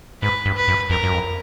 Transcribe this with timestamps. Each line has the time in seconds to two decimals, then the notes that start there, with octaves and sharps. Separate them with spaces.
0.22 G#2 B4
0.45 G2
0.57 B4
0.68 F#2
0.90 F2 A#4
1.03 F#2
1.13 F2